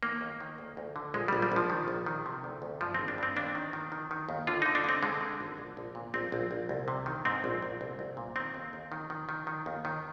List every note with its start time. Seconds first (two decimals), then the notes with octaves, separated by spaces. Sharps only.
0.03 D#3 A#3
0.21 D#2
0.40 D#3
0.58 D2
0.77 D2
0.96 D3
1.14 A#1 G#3
1.28 A#1 G3
1.42 G3
1.52 A#1 F3
1.70 D#3
1.88 A#1
2.06 D#3
2.26 C3
2.44 D2
2.62 D2
2.81 G2 F3
2.94 G#1 C4
3.08 D4
3.18 G2 C4
3.36 D#2 D4
3.55 D#3
3.73 D#3
3.92 D#3
4.11 D#3
4.29 D#2
4.47 D3 F4
4.62 D3 D#4
4.75 D4
4.84 D3 C4
5.03 D3 G#3
5.21 D3
5.41 G#1
5.58 A#1
5.77 A#1
5.95 A#2
6.14 A#1 C4
6.32 A#1
6.51 A#1
6.69 C2
6.88 C3
7.06 D#3
7.25 G#2 C4
7.44 A#1
7.62 A#1
7.81 C2
7.99 C2
8.17 A#2
8.36 D#3 C4
8.54 D#2
8.73 D#2
8.92 D#3
9.10 D#3
9.29 D#3
9.47 D#3
9.66 D#2
9.85 D#3